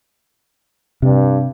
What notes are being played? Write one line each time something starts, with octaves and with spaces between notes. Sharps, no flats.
G2 C3